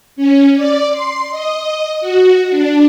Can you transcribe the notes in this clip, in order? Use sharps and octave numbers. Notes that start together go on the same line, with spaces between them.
C#4
D5
C6
D#5
F#4
D4